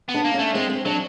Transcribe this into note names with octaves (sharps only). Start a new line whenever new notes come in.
B3
D4
A#3
A3 C#4
G#3 C4
C4
F#3 D4